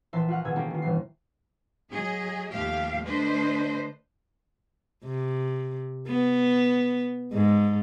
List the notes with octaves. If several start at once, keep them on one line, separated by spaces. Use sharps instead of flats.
A#1 E3 E5 A5 C6
F4 F#4 F#5 F6
B2 D#3 G#4 E6 G#6
A#3 C#4 E4 G4 A4
D#3 F4
G1 B2 E3 C7
F#3 G#4 D#5
D#2 F3 A3 G4 E5 F5
D3 A3 D4 B4 C5 D#5
C3
B3
G#2